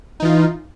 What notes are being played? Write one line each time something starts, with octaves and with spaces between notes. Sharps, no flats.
E3 D#4 F4